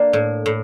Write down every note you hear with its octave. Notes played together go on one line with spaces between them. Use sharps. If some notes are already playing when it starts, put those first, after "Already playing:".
Already playing: A#3 D4
A2
A2